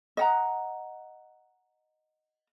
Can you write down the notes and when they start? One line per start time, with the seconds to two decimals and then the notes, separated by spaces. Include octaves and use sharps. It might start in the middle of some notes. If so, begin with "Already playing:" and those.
0.17 D#5 F#5 A#5